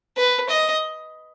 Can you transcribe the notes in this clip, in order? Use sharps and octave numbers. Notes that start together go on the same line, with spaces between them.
B4
D#5